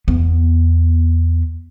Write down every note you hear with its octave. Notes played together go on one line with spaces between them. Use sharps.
E2 B3